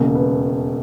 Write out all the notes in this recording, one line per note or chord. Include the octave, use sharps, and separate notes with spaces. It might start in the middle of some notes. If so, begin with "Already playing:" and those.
Already playing: E1 D#2 C#3
B4